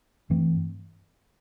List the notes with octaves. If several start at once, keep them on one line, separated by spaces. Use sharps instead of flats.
G2 E3 A3 C4